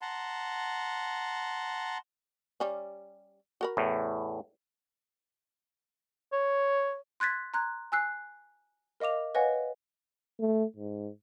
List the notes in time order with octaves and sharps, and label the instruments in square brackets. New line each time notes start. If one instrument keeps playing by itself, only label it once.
[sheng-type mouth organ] F#5 A5 A#5 C6
[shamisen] G3 C#4
F#4 A#4 B5
[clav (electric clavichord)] E2 A2
[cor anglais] C#5
[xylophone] C6 F#6 G#6 A6 B6
A#5 C6 F#6 G#6
G#5 E6 F#6 C7
A#4 D#5 F5 D6 F7
B4 C#5 D#5 F5 F#5 G#5
[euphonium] A3
G#2